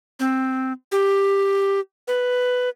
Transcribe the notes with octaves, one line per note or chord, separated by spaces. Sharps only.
C4
G4
B4